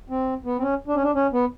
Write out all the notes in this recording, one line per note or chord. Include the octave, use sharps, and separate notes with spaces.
C4
B3
C4
C#4
D4
C#4
D4
C#4
B3